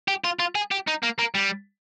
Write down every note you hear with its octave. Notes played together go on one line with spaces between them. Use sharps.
G4
F4
F4
G#4
G4
D#4
A#3
A#3
G3